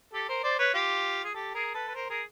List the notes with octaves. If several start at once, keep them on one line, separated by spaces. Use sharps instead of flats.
G4 A4
A#4 C5
C5 D5
B4 C#5
F4 G4
G#4
G4 A4
G#4 A#4
A4 B4
B4
A#4 C5
G#4 A#4